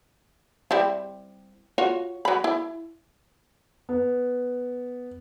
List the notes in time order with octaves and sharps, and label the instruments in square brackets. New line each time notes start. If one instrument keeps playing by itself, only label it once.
[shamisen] G3 C4 E4
F4 F#4 C#5
F#3 B5
E4
[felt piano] B3